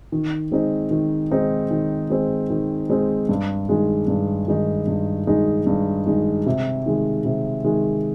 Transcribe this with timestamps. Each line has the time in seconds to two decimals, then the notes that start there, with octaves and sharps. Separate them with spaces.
0.12 D#3
0.51 G#3 C4 D#4
0.91 D#3
1.31 G#3 C4 D#4
1.71 D#3
2.10 G#3 C4 D#4
2.50 D#3
2.89 G#3 C4 D#4
3.29 G2
3.69 D#3 G#3 D#4
4.08 G2
4.48 D#3 G#3 D#4
4.87 G2
5.27 D#3 G#3 D#4
5.67 G2
6.07 D#3 G#3 D#4
6.46 C3
6.86 D#3 G#3
7.25 C3
7.65 D#3 G#3